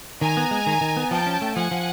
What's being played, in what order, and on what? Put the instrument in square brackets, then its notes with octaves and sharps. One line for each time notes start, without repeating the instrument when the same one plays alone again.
[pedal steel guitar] D#3 [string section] G#5 A#5
[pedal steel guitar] B3
G#3
D#3
D#3
B3
[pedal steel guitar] F3 [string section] G5 A5
[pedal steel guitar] C#4
A3
[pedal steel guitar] F3 [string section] F#5 G#5
[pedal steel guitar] F3